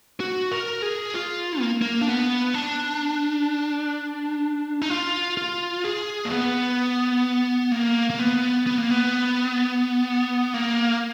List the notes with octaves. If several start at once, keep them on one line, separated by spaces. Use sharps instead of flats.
F#4
A#4
G#4
F4
A#3
A#3
D4
B3
D4
D#4
F4
F4
G#4
A#3
B3
A#3
A#3
B3
B3
A#3
B3
A#3